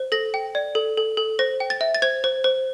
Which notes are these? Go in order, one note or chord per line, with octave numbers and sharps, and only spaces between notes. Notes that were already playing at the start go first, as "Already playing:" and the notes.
Already playing: C5
A4 A#6
G5
D5
A4
A4
A4
C5 A#6
G5
A6
E5
A6
C5 G#6
C5
C5